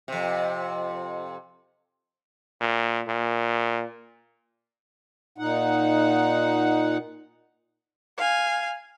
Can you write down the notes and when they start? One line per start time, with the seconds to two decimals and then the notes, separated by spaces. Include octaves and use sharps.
0.08 F2 C3
2.61 A#2
3.08 A#2
5.38 A#2 D#4 F#5
8.18 F5 G#5